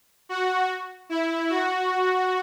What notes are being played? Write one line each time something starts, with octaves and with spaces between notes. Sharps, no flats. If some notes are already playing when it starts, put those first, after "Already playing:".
F#4
E4
F#4